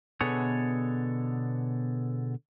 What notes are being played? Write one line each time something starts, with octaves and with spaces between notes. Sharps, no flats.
B2 D3 B3 G#4 A4 C#5